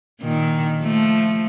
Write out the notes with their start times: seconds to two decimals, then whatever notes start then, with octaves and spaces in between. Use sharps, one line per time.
0.21 A#2 D#3
0.80 F3 A3